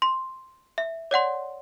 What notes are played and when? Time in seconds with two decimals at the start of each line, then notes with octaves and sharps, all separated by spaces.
0.02 C6
0.78 E5
1.11 C#5 D5 F#5 C6